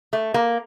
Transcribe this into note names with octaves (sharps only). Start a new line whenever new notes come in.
A3
A#3